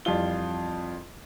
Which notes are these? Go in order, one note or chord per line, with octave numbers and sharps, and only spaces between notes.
F2 E3 G3 F4 G7